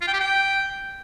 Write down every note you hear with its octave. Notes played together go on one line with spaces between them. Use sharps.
F4
G5
G4
G5